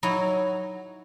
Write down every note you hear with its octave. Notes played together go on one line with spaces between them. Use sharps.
F#3 D#4 E4 F#4